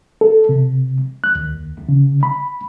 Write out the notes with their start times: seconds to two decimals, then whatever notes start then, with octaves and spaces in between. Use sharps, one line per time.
0.21 A4
0.49 C3
1.24 F#6
1.35 D#2
1.89 C#3
2.23 B5